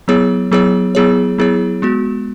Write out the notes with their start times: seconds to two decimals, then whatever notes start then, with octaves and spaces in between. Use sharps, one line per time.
0.08 F#3 B3 E4 G#4 C#5
0.52 F#3 B3 E4 G#4 C#5
0.95 F#3 B3 E4 G#4 C#5
1.38 F#3 B3 E4 G#4 C#5
1.82 G#3 B3 F#4